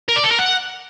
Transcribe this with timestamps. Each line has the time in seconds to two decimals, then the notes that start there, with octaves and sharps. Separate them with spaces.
0.08 A#4
0.16 D5
0.24 A4
0.31 A#4
0.39 F#5